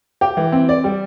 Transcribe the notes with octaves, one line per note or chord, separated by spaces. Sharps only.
G4
E3
C4
D5
G3